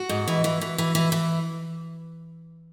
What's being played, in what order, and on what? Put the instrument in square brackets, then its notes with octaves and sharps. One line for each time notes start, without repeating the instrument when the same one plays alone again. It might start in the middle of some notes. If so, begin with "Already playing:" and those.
Already playing: [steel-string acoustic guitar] F#4
G#2
E3
E3
E3
E3
E3
E3